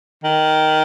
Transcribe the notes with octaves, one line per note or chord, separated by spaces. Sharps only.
D#3